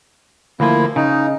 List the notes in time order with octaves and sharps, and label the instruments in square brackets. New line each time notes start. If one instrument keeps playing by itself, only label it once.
[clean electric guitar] D2 F3 [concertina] A#3 E4
[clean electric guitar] C#3 [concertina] D#4